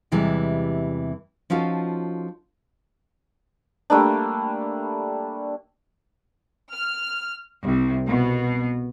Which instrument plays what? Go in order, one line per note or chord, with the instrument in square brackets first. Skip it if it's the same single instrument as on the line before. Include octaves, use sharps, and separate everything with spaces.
[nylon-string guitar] E2 C3 E3 G3 G#3 E4
F3 C#4 D#4 F4 F#4 A4
[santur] G3 A3 A#3 D4
[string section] F6
C2
B2